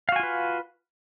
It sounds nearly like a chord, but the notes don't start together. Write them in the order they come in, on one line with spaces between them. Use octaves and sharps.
F5 F#4 G#5 F4 B4